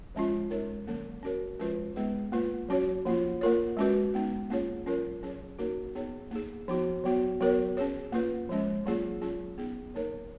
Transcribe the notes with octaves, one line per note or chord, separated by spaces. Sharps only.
F3 G#3 C#4 F4
G#3 D#4 A#4 C#5
D#3 F#3 A#3 C#4
C#4 F#4 A#4 C#5
F3 G#3 C#4 F4 B4
G#3 B3 D#4 G#4 B4
A#3 F4 B4
F#3 C#4 F#4 C#5
F3 A#3 F4
A#3 F4 A#4 C#5
G#3 C#4 F#4 B4
G#3 B3 D#4
A#3 C#4 F4 G#4 C#5
F#3 C#4 F4 A#4 C#5
F#3 C#4 G#4 C#5
A#3 D#4 F#4 A#4 C#5
B3 D#4 G#4 C#5
A#3 D#4 G#4
F3 B3 D#4 F#4
F#3 B3 F#4
F#3 B3 F#4 A#4 C#5
C#4 G#4 C#5
A#3 F4 B4
F3 G#3 C#4
F#3 A#3 C#4 F4 G#4
F#3 C#4 F4 G#4
B3 D#4 G#4
F#3 A#3 D#4 A#4 C#5